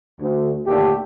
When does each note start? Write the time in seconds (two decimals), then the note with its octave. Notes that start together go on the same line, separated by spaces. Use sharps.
0.20 D2
0.66 D#2 A#2 D3 A3 G4